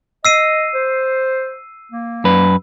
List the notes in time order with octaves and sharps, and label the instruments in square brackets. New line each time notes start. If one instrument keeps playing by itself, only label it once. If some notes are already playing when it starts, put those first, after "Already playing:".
[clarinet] D#5 [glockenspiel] E6 C7 D#7
[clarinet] C5
A#3
[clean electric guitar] F#2 B4